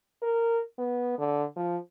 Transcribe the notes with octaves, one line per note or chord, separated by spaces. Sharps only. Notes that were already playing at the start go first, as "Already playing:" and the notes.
A#4
B3
D3
F3